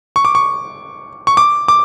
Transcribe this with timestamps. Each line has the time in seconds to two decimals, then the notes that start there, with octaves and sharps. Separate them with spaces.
0.16 C#6
0.25 D6
0.35 C#6
1.27 C#6
1.37 D6
1.68 D6